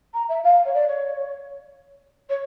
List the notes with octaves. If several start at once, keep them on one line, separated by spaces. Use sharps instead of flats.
A#5
E5
F5
C#5
D5
C#5
C#5